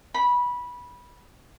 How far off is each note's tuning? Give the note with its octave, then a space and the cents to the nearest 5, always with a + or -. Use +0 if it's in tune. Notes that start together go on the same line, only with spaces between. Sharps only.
B5 -15